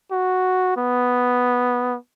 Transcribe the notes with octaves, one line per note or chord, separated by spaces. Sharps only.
F#4
B3